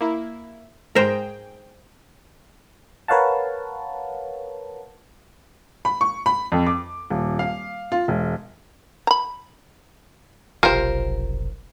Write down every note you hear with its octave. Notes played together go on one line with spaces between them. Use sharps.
A#3 E4
G#2 G#4 A#4 C5 G5
A#4 B4 C#5 F5 F#5 A5
B5
C#6
B5
F2
D6
D#1
F5
F4
E1
A#5 B5
F1 B1 F4 G4 A#4 C5